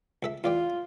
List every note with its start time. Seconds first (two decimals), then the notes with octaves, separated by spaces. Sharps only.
0.23 C#2 A4 E5
0.44 E2 F4 D5 G5